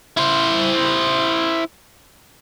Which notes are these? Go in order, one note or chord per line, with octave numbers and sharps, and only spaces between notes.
E4 C5